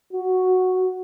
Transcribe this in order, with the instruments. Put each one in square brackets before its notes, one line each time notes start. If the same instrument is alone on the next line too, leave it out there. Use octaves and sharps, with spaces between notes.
[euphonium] F#4